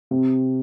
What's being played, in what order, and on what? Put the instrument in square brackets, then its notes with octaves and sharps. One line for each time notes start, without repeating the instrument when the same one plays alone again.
[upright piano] C3